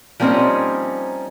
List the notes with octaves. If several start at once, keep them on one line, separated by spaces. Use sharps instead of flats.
F3 G3 A#3 C4 C#4 D#4